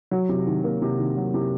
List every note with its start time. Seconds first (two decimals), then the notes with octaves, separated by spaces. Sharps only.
0.11 F#3
0.29 C3
0.47 D#3
0.64 A#3
0.82 C3
0.99 D#3
1.17 F#3
1.34 C3